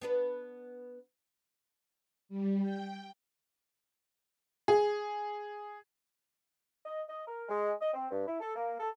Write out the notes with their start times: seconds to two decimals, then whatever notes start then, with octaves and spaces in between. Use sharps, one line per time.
0.01 B3 D4 B4
2.29 G3
2.61 G5
4.68 G#4
6.86 D#5
7.08 D#5
7.26 A#4
7.49 G#3
7.81 D#5
7.93 C4
8.10 G2
8.27 E4
8.40 A4
8.55 A#3
8.80 A4